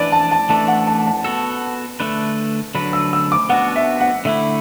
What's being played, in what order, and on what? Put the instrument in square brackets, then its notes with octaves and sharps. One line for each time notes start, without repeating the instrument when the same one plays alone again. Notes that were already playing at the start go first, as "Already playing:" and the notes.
Already playing: [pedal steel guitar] E3 D4 B4 [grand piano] D5
[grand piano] A5
A5
[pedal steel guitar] E3 A3 D4 [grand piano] A5
[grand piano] F#5
A5
A5
[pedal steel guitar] B3 F#4 A4
D3 A3 D4 B4
[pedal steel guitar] D3 F#3 D4 B4 [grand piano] B5
[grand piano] E6
E6
D6
[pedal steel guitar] B3 D4 F#4 [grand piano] F#5
[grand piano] E5
F#5
[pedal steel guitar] D3 A3 E4 [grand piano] E5